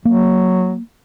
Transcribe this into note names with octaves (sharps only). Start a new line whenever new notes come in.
F#3 A#3